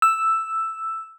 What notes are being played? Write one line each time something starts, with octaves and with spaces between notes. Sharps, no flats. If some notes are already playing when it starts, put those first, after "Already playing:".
E6